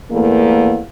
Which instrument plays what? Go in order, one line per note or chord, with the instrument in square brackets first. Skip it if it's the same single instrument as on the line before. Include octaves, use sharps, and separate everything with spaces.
[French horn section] E2 A3 A#3